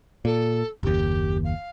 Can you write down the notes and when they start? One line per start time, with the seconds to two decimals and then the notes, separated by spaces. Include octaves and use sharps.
0.25 A#2 A4
0.83 F#1 D#2 G4
1.44 F5